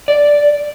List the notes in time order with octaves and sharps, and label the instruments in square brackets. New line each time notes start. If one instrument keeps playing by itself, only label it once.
[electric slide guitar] D5